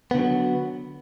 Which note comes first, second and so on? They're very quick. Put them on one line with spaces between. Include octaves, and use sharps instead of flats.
B3 D3 F#3